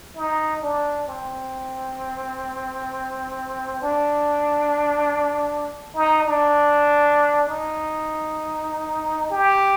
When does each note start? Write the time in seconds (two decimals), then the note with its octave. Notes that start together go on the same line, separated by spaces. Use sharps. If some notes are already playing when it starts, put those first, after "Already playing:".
0.16 D#4
0.62 D4
1.08 C4
3.82 D4
5.96 D#4
6.26 D4
7.48 D#4
9.30 G4